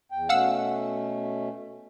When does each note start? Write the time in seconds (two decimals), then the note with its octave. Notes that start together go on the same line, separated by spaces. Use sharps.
0.12 E2 G5
0.29 B2 A3 C#4 F5 F#5 E6